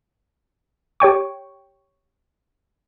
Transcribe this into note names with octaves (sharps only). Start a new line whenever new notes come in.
G4 C#5 G5 C#6